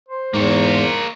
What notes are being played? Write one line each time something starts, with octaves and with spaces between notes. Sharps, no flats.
C5
E2 G#2 A#3 C#5